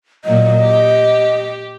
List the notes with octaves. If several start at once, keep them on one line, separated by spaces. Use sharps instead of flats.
A#2 F#3 D#5
G4